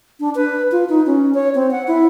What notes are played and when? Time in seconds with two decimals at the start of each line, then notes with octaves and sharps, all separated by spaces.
0.20 D4
0.35 B4
0.72 F4
0.89 D#4
1.06 C#4
1.34 C#5
1.55 C4
1.71 F#5
1.88 E4